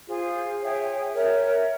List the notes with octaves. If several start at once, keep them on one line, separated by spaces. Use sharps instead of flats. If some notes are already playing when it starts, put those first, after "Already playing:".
F4 G#4 C5
G#4 C#5 E5 G5
A#4 C#5 E5